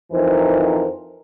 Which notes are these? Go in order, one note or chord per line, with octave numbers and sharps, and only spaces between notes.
F2 E3 F3 D#4 A#4 C5